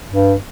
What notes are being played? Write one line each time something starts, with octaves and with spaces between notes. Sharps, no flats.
G2